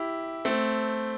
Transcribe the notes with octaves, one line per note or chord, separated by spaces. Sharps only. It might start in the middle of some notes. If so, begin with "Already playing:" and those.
Already playing: E4 G4
A3 C4